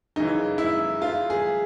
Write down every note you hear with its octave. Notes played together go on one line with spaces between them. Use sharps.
F#2 C#3 E3 D#4
E4
F4
G#4